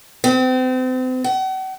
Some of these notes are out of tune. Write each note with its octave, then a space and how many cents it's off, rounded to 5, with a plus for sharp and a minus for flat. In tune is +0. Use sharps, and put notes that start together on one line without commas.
C4 -35
F#5 +40